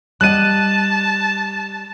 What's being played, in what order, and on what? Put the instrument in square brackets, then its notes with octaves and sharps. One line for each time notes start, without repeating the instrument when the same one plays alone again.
[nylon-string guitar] G3 D#5 F#5 [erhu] A5 [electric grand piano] F#6 D#7